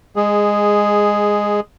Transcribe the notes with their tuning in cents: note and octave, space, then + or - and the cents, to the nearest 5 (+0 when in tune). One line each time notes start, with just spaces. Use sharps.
G#3 -15 G#4 +0